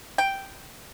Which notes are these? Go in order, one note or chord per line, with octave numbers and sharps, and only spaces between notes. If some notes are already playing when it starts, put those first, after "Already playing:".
G5